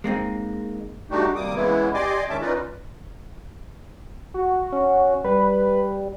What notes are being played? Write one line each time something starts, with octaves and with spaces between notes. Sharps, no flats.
G#3 A#3 C4 D#4
G3 A3 D4 D#4 F#4 G4
D#2 C3 G3 A#3 D6 D#6
C#3 E3 G#3 B3 E4
G4 D5 D#5 G#5 C6 D6
D#3 G#3 C#4 E5 A5 D6
C#4 D#4 F4 B4 D5 D#5
F#4
C#4
G3 B4